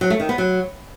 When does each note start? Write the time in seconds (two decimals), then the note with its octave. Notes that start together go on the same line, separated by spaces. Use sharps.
0.01 F#3
0.10 A3
0.20 D#3
0.29 B3
0.38 F#3